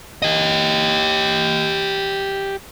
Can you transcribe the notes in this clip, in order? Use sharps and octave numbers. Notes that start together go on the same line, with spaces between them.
G4 D#5